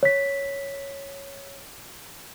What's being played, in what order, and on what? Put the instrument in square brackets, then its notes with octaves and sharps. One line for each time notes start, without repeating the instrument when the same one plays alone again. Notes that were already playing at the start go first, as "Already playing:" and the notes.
[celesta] C#5 B6